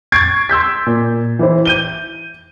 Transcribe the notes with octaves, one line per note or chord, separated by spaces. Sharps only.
C#6 G#6 A6 C7 D7
C6 E6 G6 B6
A#2
E3 E4 C5
G6 D#7 G7